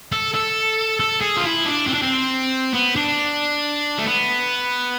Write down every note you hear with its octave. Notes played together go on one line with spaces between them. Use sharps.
A4
A4
A4
G#4
F4
E4
D4
C4
D4
C4
B3
D4
A3
B3